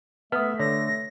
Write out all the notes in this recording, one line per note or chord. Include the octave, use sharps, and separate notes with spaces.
A3 B3 B4 E5 D#6
D3 C#5 A#6